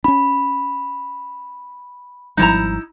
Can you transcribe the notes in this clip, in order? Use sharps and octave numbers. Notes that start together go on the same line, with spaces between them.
C#4 D4 B5
G#1 F3 G3 D#4 E4 A#5